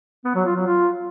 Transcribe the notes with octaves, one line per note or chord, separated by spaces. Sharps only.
B3
F#3
F4
F#3
F4